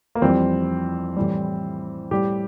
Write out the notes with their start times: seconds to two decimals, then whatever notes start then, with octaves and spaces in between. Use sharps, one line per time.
0.15 A#3
0.22 F2 E3 G3 C4
1.16 A2 E3 G3
2.11 A2 G3 G4